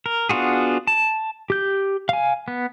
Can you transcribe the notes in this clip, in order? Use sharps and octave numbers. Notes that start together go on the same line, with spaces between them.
A#4
B3 D4 F4 F#4 G#4
A5
G4 G6
F5 G#5
B3